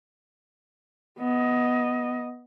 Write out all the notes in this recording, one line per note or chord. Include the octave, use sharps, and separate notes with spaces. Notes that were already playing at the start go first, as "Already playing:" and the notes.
B3 D#5